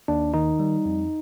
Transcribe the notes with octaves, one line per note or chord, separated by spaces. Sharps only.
D#2 D4
D#3 D#4
G3
F2